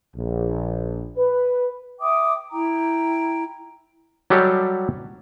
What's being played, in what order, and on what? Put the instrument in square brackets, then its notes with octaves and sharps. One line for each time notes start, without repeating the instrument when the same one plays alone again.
[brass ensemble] A#1
B4
[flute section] E5 G5 D6 D#6
E4 G5 A#5
[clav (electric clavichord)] F#3 G3 G4 A4 D#5